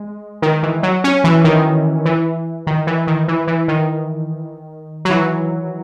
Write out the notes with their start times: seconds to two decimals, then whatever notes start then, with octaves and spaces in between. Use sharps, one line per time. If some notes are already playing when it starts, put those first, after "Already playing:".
Already playing: G#3
0.42 D#3
0.63 E3
0.83 F#3
1.04 C#4
1.24 E3
1.44 D#3
2.05 E3
2.67 D#3
2.87 E3
3.07 D#3
3.28 E3
3.47 E3
3.68 D#3
5.05 F#3
5.10 E3